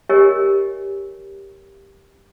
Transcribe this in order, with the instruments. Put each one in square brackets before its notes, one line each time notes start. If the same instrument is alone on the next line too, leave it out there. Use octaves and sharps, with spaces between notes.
[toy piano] G4 A#4 C#5 D#5 G#5